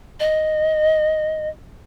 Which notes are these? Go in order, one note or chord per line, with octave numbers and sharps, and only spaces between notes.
D#5